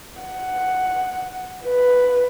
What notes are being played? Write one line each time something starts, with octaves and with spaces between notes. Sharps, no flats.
F#5
B4